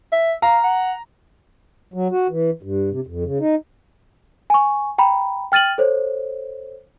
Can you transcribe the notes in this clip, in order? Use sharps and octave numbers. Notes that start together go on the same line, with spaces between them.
E5
F5 A#5
F#5
F#3
F#4
E3
G2
C3
F2
C#3
D#4
G#5 C#6
G5 A#5 B5
G5 F6 A6 D#7 F#7
A4 C5 C#5